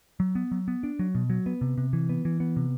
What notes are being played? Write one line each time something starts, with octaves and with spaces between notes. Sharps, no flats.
F#3
B3
F#3
B3
D4
F#3
B2
F#3
B3
C3
C3
E3
B3
E3
B3
C3